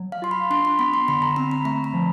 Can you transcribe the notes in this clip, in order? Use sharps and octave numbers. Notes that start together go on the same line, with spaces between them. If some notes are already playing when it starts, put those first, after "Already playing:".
Already playing: F#3
F5
F4 C6
B5
D4 C6
B5
B3 B5
C6
D3 B5
A#5
C4 B5
B5
A3 A#5
B5
F3